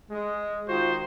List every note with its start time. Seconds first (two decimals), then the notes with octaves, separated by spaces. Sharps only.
0.10 G#3
0.68 D#3 F4 F#4 C5